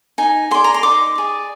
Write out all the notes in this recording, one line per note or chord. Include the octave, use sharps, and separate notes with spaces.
D#4 G#5
G#4 D5 C6
A#5
C6
D#4 D6
G#4 D5